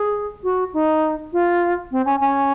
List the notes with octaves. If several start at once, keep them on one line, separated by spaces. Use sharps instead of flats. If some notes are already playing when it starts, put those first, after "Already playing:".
Already playing: G#4
F#4
D#4
F4
C4
C#4
C#4